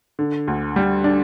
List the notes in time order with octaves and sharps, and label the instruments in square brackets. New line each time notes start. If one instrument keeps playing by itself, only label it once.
[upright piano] D3
D2
G3
D4